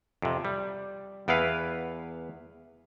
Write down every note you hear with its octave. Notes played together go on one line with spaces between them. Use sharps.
F2 C3
G3
E2 B3 E4 B4 F5